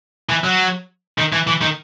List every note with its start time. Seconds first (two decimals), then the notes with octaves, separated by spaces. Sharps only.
0.29 E3
0.44 F#3
1.18 D#3
1.33 E3
1.47 E3
1.61 D#3